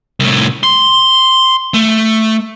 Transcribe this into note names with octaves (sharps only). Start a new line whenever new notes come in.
C2 A2
C6
A3